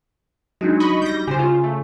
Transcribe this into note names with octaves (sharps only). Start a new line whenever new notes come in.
F#3 G#3 D4 D#4 F#4
D#5 B5 C#6
G3 G6 A#6
C#3 G4 C5 G#5
F4
A3